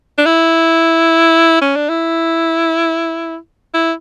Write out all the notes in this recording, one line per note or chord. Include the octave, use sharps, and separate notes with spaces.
D4
E4
C#4
D4
E4
E4